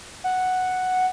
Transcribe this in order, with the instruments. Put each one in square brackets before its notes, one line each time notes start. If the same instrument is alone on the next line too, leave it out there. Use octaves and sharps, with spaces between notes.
[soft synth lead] F#5